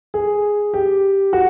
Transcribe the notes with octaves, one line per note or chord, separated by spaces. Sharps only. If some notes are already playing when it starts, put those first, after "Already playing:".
G#4
G4
F#4